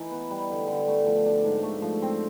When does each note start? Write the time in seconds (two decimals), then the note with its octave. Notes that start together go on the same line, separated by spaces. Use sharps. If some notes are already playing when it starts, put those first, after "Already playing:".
Already playing: E3 D#4
0.11 B3
0.31 G3
0.50 D3
0.68 D3
0.88 A3
1.07 F3
1.26 D4
1.44 G#2
1.63 A3
1.82 F3
2.02 C4